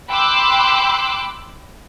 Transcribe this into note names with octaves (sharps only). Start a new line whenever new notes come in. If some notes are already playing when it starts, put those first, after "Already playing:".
G5 B5 C6 D6 E6 F#6